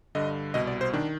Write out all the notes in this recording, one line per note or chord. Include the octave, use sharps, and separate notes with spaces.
G2 D3 D#5
C2 B2 D#5
D5
C5
D#3 D4